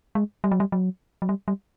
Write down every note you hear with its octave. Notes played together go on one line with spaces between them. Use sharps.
G#3
G3
F#3
G3
F#3
F#3
G3
G3